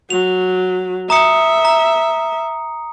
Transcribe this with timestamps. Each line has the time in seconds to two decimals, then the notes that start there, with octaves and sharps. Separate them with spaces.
0.10 F#3 F7
1.10 E5 A#5 D#6 C#7
1.65 A#5